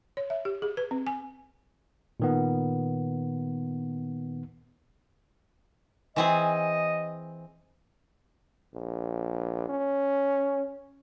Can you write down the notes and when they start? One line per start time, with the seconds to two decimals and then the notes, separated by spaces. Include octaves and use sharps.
0.17 C#5
0.30 E5
0.45 G4
0.62 G#4
0.77 B4
0.91 C4
1.07 G#5
2.20 A#2 D#3 B3
6.16 E3 C4 G#4 D#5
8.74 A#1
9.69 C#4